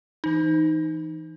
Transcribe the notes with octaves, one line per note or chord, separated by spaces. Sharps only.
E3 D#4